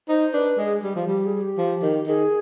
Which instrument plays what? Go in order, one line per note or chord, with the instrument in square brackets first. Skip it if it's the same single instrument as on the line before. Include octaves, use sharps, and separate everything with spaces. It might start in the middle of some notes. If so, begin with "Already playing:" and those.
[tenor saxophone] D#4 [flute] C5
[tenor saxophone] D4 [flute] B4
[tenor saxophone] G#3 [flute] G#4
[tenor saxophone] G3
[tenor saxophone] F3 [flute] G4
[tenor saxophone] G3 [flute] G4
[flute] G#4
G4
[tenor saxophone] F3
D#3
[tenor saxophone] D#3 [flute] G#4